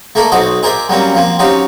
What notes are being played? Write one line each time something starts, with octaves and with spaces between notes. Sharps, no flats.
A3 A#3 A4 A#4 D5
B1 C4 F#4 C5 D#5
G#4 A#4 C5 D5 E5
F#3 G3 A#3 C4 C#4
F3 A#3 C4
F#3 C4 C#4 D#4 F4 G4